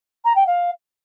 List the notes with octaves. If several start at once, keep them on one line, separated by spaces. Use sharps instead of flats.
A#5
G5
F5